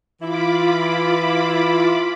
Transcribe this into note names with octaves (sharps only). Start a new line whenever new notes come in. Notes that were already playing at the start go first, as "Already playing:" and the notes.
E3 E4 F4 B5 D6